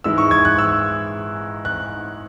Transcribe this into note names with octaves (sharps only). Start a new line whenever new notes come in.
G#2 E3 G#3 E4 E6
C#6
G#6
F#6
E6
F#6